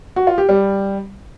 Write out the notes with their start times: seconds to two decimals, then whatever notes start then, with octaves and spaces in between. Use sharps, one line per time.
0.16 F#4
0.27 F4
0.38 G4
0.49 G3